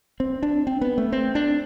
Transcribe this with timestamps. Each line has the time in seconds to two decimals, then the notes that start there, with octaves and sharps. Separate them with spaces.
0.20 C4
0.43 D4
0.67 C4
0.81 B3
0.98 A3
1.12 C4
1.35 D4